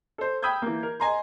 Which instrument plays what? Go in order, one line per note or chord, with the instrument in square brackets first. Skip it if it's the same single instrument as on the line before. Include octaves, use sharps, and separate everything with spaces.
[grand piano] A4 C5
G5 B5 D#6 E6 G6 G#6
E3 A#3
A#4
D#5 G#5 A#5 C6